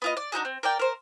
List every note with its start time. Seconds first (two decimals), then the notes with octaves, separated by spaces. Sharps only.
0.02 B3 F4 D#5
0.17 D5
0.32 D4 D#4 F#4 G#4
0.45 C4
0.63 A#4 D5 G5
0.79 A#4 C5